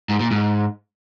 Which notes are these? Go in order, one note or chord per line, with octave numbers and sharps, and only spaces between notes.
G#2
A#2
G#2